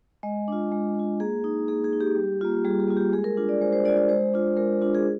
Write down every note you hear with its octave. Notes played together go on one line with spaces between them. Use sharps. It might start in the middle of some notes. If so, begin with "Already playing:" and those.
G#3 D#5
D4 F4
G#3
D4 F4
A#3 G#4
D#4
A#3 G#4
G#4
D#4
G4
G3
A#3 F4
G3 G#4
G#4
A#3 F4
G4
G#3 G#4
A#4
D4 F4
D5
G#3 C5
C5
D4 F4 D5
D5
G#3 C5
D4 F4
G#3 A#4
D4 F4
G#4